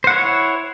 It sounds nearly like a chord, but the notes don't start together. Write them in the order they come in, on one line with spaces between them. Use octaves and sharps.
C5 F#5 E4 C#5